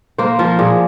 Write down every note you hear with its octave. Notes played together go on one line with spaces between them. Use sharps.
A#3 C5
F3 A#4
A#2 G#4